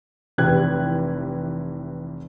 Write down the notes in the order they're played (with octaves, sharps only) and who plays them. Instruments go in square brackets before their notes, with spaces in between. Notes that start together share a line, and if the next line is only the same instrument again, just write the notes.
[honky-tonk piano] F1 E3 G4 B4 F#6 G#6